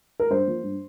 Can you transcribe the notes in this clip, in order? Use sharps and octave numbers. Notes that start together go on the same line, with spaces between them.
A#4
G2 C5
F3 A#3
G2